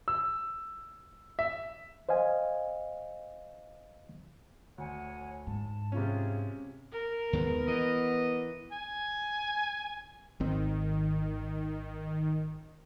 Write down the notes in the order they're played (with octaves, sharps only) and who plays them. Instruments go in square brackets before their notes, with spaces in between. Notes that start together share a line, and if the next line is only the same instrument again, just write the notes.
[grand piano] E6
E5
[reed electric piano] C5 D#5 F5 G#5
[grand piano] D2 [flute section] C#5 F#5 G#5
[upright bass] G#2 [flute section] A5
[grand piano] C3 C#4 [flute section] F4 G#4
[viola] A#4
[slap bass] D#2 D#3 G#3 [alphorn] B3
[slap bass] E3 [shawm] D#5
[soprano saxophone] G#5
[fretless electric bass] G#1 C4 [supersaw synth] D#3